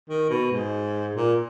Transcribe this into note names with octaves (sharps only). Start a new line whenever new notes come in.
D#3
B2
G#2
A#2